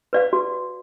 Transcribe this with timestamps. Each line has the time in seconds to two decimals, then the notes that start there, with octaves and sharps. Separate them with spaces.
0.13 B4 D5 F5
0.33 F#4